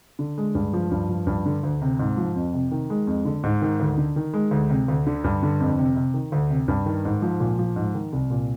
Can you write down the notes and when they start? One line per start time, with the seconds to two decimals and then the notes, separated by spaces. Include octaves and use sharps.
0.19 D3
0.38 G#3
0.55 G2
0.73 F3
0.91 G2
1.09 F3
1.27 G2
1.46 D3
1.63 D2
1.82 C3
1.99 G#2
2.17 F3
2.36 F2
2.53 C3
2.71 D#3
2.90 G#3
3.07 F2
3.25 D3
3.43 G#2
3.62 D#3
3.80 D2
3.98 D3
4.16 D#3
4.34 G#3
4.51 D2
4.70 C3
4.88 D2
5.07 D3
5.24 G2
5.43 D3
5.60 F2
5.78 C3
5.96 C3
6.14 D#3
6.32 D2
6.50 C3
6.68 G2
6.86 D#3
7.05 G#2
7.22 F3
7.40 A#2
7.59 F3
7.76 G#2
7.94 D#3
8.12 C2
8.30 A#2